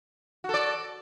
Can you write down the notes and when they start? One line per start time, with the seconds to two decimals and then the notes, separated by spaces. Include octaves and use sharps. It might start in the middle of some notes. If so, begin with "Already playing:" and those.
0.44 F#4
0.49 A4
0.54 D5